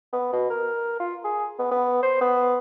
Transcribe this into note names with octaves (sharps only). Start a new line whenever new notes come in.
B3
B2
A#4
F4
G#4
B3
B3
C5
B3